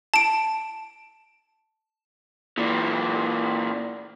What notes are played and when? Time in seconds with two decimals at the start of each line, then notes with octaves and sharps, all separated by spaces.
0.14 A5 D7
2.58 A#2 E3